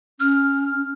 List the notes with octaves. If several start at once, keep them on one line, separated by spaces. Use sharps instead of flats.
C#4 F6